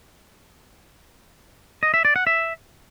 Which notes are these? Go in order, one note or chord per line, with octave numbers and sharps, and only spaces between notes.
D#5
E5
D5
F#5
E5